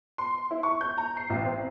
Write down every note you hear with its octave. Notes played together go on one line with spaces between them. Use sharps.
C6
E4
C#6
G6
A#5
C7
A1
C4